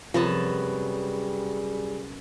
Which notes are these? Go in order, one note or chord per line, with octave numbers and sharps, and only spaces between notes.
F#2 C3 F3 G3 B3 G#4 A5